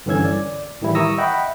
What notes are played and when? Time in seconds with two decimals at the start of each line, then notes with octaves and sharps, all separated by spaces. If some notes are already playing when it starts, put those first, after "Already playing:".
0.06 G2 D3 E3 C#4 E6 G#6
0.25 D5
0.81 A2 D#3 E3 G3 E4
0.95 A#5 C#6 D#6 E6 A#6
1.18 D#5 E5 F#5 G5 B5